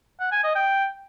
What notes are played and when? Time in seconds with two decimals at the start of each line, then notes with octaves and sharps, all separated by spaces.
0.20 F#5
0.32 G#5
0.44 D#5
0.55 G5